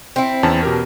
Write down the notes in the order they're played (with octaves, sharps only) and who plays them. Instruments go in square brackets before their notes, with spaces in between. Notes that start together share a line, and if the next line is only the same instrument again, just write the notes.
[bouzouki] C4 E4
[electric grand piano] E2 C#4 A5
B2 G4 A#4